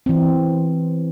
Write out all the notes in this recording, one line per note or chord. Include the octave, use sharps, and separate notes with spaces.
E3 C4